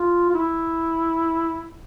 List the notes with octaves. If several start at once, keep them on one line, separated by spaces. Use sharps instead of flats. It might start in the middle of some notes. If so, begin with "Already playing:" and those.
Already playing: F4
F4
E4